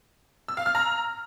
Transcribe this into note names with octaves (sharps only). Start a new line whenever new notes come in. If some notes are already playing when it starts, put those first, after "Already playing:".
E6
F5
F6
A#5